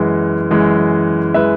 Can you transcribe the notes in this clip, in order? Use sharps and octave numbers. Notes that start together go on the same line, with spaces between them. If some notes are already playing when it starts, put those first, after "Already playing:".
Already playing: F#2 E3 G#3
F#2 E3 G#3
E3 G#3 B4 E5